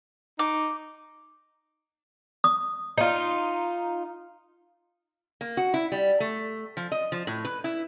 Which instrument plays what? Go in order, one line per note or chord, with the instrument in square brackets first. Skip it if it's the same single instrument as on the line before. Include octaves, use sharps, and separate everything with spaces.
[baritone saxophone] D#4 [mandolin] D6
[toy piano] D#6
[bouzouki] D#4 F4
[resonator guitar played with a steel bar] A#3
F#4
E4
G3
A3
F3
D#5
F3
A2
B4
E4